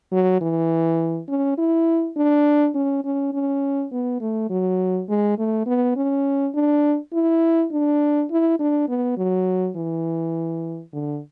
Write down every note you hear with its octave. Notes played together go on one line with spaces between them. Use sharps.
F#3
E3
C#4
E4
D4
C#4
C#4
C#4
B3
A3
F#3
G#3
A3
B3
C#4
D4
E4
D4
E4
D4
B3
F#3
E3
D3